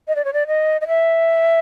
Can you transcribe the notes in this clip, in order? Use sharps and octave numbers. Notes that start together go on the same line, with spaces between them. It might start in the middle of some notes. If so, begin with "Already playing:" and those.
D#5
D5
C#5
D5
D#5
D#5
E5